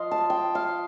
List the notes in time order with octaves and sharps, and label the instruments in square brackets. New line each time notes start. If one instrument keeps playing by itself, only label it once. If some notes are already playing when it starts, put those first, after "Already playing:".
Already playing: [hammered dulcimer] F3 F4 D#5 F5 C6
A5
G5
F5